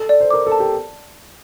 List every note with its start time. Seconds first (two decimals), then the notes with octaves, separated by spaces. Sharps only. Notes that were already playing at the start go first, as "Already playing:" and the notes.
Already playing: A4
0.09 D5
0.21 C5
0.30 A#4 D6
0.47 A4
0.52 A5
0.60 G4